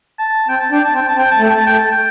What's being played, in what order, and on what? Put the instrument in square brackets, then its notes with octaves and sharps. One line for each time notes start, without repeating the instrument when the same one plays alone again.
[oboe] A5
[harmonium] C4 [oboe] G5
[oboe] A5
[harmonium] D4 [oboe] G5
[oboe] A5
[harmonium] C4 [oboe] G5
[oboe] A5
[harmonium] C4
[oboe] G5
A5
[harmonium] A3
[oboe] G5
A5
[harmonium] A3 [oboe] G5
[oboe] A5
G5